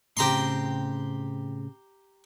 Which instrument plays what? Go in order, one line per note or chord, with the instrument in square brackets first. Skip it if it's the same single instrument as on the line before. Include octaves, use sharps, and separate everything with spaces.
[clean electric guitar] A2 C#3 C4 [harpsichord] G4 A#5 C6